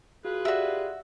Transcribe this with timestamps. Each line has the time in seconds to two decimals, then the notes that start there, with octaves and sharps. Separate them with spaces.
0.25 F4 F#4 G#4 B4
0.45 F#4 G4 D5 E5